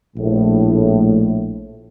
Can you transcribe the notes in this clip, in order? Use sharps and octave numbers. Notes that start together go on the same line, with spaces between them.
A#1 A2